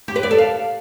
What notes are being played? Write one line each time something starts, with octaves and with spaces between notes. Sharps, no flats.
G4
B4
D5
A4
F5